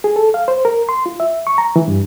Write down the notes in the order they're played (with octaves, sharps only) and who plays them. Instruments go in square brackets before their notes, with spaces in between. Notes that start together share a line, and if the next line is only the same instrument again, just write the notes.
[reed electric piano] G#4
A4
F5
C5
A#4
C6
F4
E5
C#6
A#5
E3
G2